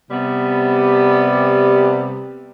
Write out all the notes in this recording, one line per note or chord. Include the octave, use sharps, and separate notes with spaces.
C3 G3 B3